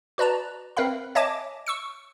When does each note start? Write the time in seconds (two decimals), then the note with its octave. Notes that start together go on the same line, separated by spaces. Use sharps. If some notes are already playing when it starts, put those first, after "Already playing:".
0.18 F#4 B4 D5 A5 A#5
0.77 C4 A#4 B4 E5 F5 B5
1.15 C#5 D#5 E5 G#5 A5 D6
1.67 C#6 E6 C#7